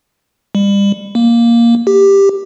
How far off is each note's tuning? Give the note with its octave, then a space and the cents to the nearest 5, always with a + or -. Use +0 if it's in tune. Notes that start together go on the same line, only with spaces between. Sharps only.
G3 +35
A#3 +5
G4 +10